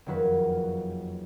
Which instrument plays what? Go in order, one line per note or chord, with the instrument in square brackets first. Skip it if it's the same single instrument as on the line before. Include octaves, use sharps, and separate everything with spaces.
[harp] F#1 F2 D#3 F#3 A#3 B4